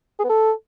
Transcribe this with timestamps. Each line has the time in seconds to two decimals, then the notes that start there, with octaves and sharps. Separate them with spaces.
0.19 G#4
0.24 B3
0.29 A4